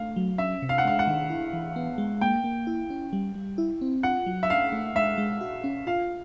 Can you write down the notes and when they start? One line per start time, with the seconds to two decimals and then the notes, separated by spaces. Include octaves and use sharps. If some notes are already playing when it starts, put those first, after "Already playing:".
Already playing: A3 F5
0.16 F#3
0.38 C#4 E5
0.62 C3
0.69 F5
0.78 F#5
0.85 G#3 F5
0.99 F#5
1.07 D#3
1.30 E4
1.53 E3
1.76 B3
1.98 G#3
2.21 A#3 G5
2.44 A#3
2.67 E4
2.90 C#4
3.13 G3
3.35 G3
3.58 E4
3.81 C4
4.03 F4 F#5
4.26 F#3
4.43 E5
4.50 C#4 F5
4.72 A3
4.95 G#3 E5
5.18 G#3
5.41 F#4
5.64 C#4
5.87 F4 F5